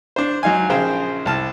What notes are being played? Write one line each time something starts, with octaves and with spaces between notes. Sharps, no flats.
D4 C5
F#3 D#4 F5 G#5
A#1 C#3 G#4 C5 G5
C2 A5 F6